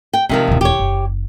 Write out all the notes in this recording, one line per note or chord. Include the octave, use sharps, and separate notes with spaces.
G5
C3 D#3 F3 G#3
D#1 E2
G4 C#5
F#1